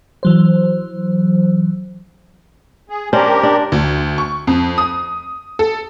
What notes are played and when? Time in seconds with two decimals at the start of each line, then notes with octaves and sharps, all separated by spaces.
0.23 E3 F#3 C5
2.89 G#4
3.13 C#4 D4 G4 A#4 C5
3.43 D4
3.72 D2
4.18 C#6
4.47 F2
4.78 D#6
5.59 A4